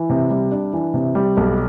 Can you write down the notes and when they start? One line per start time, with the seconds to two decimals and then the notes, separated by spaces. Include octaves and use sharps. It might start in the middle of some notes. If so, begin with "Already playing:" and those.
Already playing: E3
0.10 C3
0.30 G3
0.51 D4
0.73 E3
0.94 C3
1.15 G3
1.37 B1